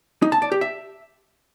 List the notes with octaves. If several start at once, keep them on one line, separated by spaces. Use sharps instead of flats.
D#4
A5
D5
G4
E5